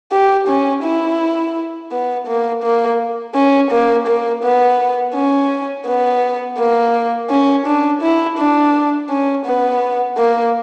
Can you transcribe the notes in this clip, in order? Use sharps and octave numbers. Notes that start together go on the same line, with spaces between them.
G4
C#4
E4
B3
A#3
A#3
C#4
A#3
A#3
B3
C#4
B3
A#3
C#4
D4
E4
D4
C#4
B3
A#3